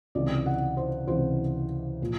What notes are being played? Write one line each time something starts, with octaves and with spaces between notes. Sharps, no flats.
C#2 C3 E3 D5
F#5
C5
C#2 C3 E3 C5
A#2 F3